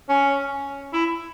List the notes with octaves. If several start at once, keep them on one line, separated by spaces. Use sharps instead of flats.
C#4
E4